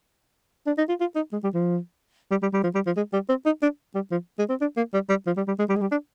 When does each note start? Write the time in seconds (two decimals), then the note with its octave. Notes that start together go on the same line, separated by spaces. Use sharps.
0.67 D4
0.78 D#4
0.89 F4
1.00 F4
1.16 D#4
1.32 G#3
1.44 G3
1.54 F3
2.31 G3
2.42 G3
2.53 G3
2.63 F3
2.75 G3
2.86 F3
2.97 G#3
3.13 G3
3.29 C4
3.45 D#4
3.62 D4
3.95 G3
4.11 F3
4.39 G#3
4.49 C4
4.61 D4
4.77 A#3
4.94 G3
5.09 G3
5.26 F3
5.37 G3
5.47 G3
5.59 G#3
5.69 G3
5.76 G#3
5.81 G3
5.91 D4